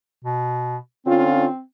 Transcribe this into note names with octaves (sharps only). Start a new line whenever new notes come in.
B2
D3 C4 C#4 F4